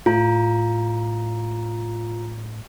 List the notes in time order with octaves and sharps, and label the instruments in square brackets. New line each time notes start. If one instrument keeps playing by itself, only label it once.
[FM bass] A2 [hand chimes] F4 A#5